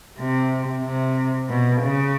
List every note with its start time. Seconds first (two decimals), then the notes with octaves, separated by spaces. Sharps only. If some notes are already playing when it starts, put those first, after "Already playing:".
0.19 C3
0.84 C3
1.49 B2
1.82 C#3